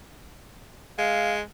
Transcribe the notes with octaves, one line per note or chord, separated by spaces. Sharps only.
G#3 F5